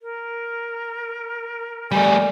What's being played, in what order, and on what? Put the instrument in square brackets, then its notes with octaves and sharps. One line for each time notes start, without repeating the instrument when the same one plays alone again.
[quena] A#4
[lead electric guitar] G3 A3 [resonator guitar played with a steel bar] D5 [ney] G#5